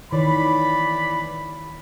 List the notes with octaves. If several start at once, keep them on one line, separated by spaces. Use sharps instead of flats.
D#3 E3 C#5 D5 B5